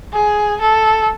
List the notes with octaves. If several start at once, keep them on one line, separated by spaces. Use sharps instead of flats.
G#4
A4